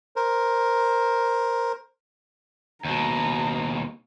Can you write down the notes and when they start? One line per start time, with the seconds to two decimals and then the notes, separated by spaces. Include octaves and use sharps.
0.16 A#4 C5
2.85 D#2 B2 A#5